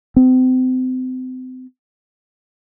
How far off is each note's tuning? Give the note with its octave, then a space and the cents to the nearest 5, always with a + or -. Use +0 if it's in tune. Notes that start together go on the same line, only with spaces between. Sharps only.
C4 -35